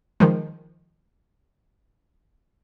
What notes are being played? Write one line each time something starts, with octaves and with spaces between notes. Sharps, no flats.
D#3 F3 G#3